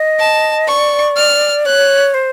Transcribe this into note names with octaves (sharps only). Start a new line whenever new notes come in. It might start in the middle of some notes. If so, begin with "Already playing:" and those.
Already playing: D#5
A5
D5 C#6
F6
C#5 F#6
C5